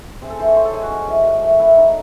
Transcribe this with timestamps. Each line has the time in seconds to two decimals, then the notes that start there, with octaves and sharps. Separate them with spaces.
0.21 C4 G#4
0.30 A4
0.39 E3 C5
0.48 C#5
0.56 A2 C5
0.65 A4
0.73 G#3 G#4
0.82 F#4
0.90 C#4
1.08 E3
1.24 F#2
1.42 A3
1.59 A3 E4
1.76 C#3 D#4